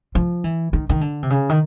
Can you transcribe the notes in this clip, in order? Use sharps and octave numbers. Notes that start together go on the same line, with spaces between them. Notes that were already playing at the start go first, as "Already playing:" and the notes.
F3
E3
D#3
D#3
D3
C3
C#3
D#3